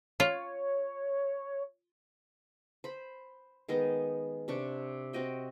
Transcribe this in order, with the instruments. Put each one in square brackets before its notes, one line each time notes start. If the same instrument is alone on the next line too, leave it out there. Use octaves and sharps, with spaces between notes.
[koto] F4 [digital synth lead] C#5
[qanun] C5 B5
D#3 G#3 B3 D#5
C3 D4 C#6
C4 F#4 D#5 G5